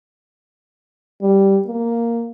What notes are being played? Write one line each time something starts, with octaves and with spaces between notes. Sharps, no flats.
G3
A#3